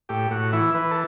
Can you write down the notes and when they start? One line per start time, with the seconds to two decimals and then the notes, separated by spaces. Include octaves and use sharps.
0.09 A2 G4
0.31 A2 F#4
0.53 E3 E4
0.74 E3 B4
0.91 A4